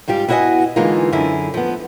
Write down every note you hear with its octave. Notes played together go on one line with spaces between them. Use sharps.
G#2 G3 F4 G4
B3 E4 F#4 B4 D#5 G#5
D3 E3 G#3 A#3 D#4 F4
F#2 D3 E4 G#4
F3 B3